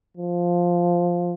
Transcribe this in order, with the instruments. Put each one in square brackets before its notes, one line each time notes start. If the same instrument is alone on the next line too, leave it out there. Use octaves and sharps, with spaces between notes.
[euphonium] F3